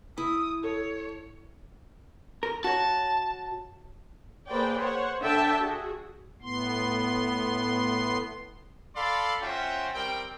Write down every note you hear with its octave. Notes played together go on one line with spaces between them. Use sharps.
E4 D#6
A4 C#5
A#4
F#4 C#5 A5
A#3 G#4 B4 C5 D5 G5
C5 C#5 F#5
D3 D4 E5 G5 A5
F#4 G#4
A2 B3 C6
A4 D5 F5 B5 C6
C#4 F4 F#4 C5 E5 G5
G3 C4 A#4 G5